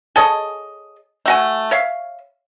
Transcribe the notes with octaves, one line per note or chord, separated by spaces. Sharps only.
G#4 A4 C#5 D#5
A3 F#4 G#5
C#5 E5 F5